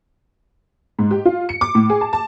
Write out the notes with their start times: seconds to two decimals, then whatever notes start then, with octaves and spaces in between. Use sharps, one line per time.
0.99 G#2
1.11 G4
1.25 F4
1.49 C#7
1.61 D6
1.75 A2
1.90 G#4
2.01 A5
2.13 A5